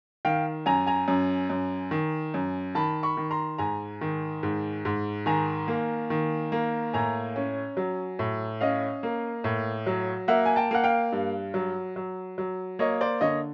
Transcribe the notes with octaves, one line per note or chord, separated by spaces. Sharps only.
D#3 F5 G5
F#2 G#5 A#5
G#5 A#5
F#2
F#2
D#3
F#2
D#3 A5 B5
B5 C#6
D#3
A#5 C6
G#2 G#5 A#5
D#3
G#2
G#2
D#3 G#5 A#5
A#3
D#3
A#3
A2 G#5 A#5
C#4
F#3
A2
C#4 D#5 F5
A#3
A2
F#3
A#3 E5 F#5
G#5
G5 A5
A#3 F#5
F5 G5
G2
F#3
F#3
F#3
A#3 C#5 D#5
C5 D5
D3 C#5 D#5